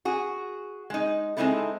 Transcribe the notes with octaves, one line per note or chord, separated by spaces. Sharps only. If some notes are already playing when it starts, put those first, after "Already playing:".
F#4 G#4
G#3 D#4
G#3 C4 C#4 D#4 E4 A4